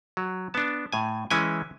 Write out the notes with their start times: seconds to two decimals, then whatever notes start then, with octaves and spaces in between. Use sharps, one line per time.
0.17 F#3
0.54 B3 D4 A5
0.92 A2 G#5
1.31 E3 G#3 C#4 E4 G#5